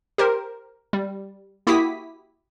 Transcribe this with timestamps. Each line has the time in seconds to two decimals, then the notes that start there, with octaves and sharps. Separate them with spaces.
0.18 G4 A#4 C5
0.93 G3
1.67 A#3 E4 F#4 G4 D#6 B6